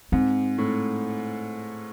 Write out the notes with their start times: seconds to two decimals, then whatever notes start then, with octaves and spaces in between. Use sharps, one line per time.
0.12 G#2 C4
0.58 A2